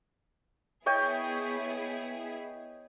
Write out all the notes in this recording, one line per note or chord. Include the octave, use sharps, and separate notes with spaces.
B3 E4 G#4 C#5 D#5 G5